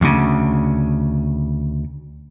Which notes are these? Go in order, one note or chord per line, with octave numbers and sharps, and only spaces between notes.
D2 C#3